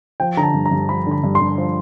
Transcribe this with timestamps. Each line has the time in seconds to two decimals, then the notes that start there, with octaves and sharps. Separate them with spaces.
0.20 F3 G5
0.37 D3 A#5
0.43 A5
0.54 G2
0.66 A#5
0.72 G2
0.89 F3 B5
1.07 D3 B5
1.24 G2
1.35 C6
1.41 G2
1.58 F3